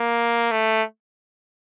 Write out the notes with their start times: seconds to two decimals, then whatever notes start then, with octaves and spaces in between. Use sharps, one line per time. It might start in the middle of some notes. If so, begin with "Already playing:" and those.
Already playing: A#3
0.51 A3